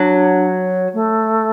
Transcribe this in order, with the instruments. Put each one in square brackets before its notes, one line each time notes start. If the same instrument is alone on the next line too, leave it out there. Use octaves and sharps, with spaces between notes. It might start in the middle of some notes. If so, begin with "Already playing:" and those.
Already playing: [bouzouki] F#3 [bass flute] D4
[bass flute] A3